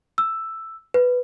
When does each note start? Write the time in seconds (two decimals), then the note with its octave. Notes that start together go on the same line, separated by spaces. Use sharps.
0.18 E6
0.94 B4